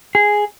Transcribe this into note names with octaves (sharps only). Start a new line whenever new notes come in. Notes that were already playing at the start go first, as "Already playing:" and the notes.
G#4